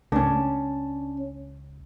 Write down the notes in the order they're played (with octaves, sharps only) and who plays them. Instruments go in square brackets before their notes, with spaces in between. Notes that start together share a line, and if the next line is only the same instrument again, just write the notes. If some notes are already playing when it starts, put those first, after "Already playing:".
[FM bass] C#2 [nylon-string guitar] C#4 D4